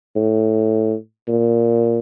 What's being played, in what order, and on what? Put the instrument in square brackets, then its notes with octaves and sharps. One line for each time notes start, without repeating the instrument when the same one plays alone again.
[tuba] A2
A#2